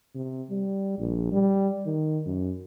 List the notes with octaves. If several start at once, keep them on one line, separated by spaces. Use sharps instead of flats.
C3
G3
A#1
G3
D#3
F#2